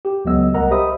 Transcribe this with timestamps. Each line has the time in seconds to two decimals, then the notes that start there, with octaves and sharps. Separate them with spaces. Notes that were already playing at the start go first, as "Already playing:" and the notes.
0.05 G4
0.25 C#2 F#3 A3 B3 D#5 E6
0.54 C2 A#4 D#5 F#5 A#5
0.71 G4 C5 D#5 E5 B5 D#6